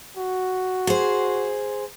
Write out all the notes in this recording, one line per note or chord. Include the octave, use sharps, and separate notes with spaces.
F#4
G#4 C5